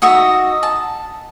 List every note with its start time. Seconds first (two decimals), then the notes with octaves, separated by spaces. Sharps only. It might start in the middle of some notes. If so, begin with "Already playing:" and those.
0.02 D#4 F#4 D#5 E5
0.63 A5